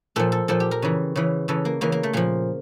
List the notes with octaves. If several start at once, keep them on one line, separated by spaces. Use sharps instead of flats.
A#2 F3 A4
A4
A#2 F3 A4
G4
A#4
C#3 E3
C#3 E3
C#3 E3 A4
A#3
C#3 E3 A#3
A#3
A3
A#2 F3 A#3